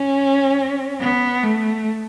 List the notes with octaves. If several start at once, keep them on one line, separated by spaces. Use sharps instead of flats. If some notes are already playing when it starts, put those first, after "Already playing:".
Already playing: C#4
B3
A3